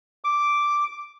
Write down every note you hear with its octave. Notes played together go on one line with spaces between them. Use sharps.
D6